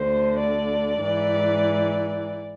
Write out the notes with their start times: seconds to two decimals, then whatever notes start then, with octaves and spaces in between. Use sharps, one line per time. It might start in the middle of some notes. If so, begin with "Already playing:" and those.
Already playing: D2 D3 C5
0.39 D5
1.02 G#2 E3